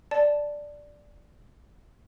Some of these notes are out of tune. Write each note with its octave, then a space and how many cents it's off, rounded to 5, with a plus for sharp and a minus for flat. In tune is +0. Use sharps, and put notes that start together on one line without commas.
D5 +0 A5 +0